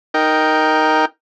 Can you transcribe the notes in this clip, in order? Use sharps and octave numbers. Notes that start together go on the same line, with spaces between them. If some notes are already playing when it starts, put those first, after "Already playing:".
D#4 A#4 G5